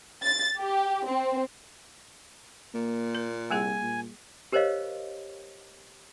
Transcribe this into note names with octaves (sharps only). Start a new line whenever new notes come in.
A6
G4
C4
A#2 A#3
A#4
C2 G3 A#3 G#4 G#5
A#2
G4 A#4 C5 C#5 D#5 F5